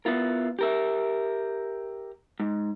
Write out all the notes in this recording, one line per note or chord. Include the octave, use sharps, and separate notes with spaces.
B3 E4 F4 A#4
G4 A#4 E5
G#2